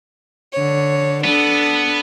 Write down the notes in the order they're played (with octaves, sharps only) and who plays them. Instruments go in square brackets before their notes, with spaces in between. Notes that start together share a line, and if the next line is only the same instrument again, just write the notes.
[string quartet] D3 C#5
[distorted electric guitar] B3 [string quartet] D4 A4